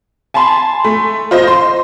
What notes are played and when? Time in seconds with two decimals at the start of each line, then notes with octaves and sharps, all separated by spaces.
0.34 G#5 A5 B5 C6
0.84 A3
1.31 F4 C5 D#5
1.47 C6